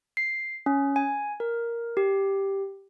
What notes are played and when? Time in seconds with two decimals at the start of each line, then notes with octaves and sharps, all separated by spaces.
0.17 C7
0.66 C#4
0.96 G#5
1.40 A#4
1.97 G4